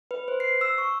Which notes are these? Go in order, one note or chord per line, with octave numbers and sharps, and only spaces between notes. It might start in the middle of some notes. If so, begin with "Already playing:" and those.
B4
C5
C7
E6
C#6